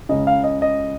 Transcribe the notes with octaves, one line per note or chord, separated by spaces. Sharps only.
C#2 C#3 D#5
F5
D#5
D#5